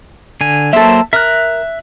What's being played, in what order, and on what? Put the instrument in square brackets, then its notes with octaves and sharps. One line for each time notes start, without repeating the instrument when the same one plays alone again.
[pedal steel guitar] D3 G#5
[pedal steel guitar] F#3 A#3 C5 [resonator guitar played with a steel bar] A4 E5
[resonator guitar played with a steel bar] A#4 [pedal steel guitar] E5 F#6